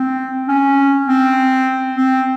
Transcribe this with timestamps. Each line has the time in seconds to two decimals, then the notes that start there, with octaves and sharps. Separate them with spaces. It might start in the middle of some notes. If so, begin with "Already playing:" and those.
Already playing: C4
0.48 C#4
1.08 C4
1.96 C4